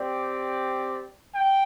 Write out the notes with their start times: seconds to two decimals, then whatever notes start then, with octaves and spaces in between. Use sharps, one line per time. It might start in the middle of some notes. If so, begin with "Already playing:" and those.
Already playing: C4 G4 D5
1.35 G5